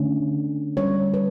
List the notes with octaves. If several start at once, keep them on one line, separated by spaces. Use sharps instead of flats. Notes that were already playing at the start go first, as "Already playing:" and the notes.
Already playing: D3 A3 C#4
D3 G3 C#4 C#5
B4